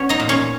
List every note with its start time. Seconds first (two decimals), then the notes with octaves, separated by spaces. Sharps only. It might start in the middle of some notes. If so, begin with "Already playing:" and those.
Already playing: B3 C#4 C#5
0.09 D#4 D#5
0.20 A#2
0.29 C#4 C#5